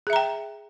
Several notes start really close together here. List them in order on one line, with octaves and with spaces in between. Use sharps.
G#4 E5 A#5 G5